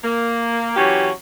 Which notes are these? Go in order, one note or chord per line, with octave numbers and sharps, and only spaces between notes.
A#3
E3 F#3 C#4 G4